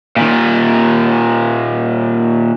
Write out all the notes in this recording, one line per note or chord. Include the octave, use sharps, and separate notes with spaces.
A#2 D#3